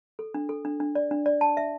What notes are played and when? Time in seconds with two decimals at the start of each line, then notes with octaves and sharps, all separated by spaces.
0.19 A4
0.34 D4
0.49 A4
0.65 D4
0.80 D4
0.95 D5
1.11 D4
1.26 D5
1.41 A5
1.57 E5